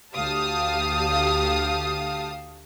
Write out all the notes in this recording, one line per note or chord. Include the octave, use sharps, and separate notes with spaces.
D2 G4 F5 A5 D#6